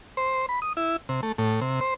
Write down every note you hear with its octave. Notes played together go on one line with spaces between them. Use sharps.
C5
B5
D#6
E4
C3
A3
A2
C3
C5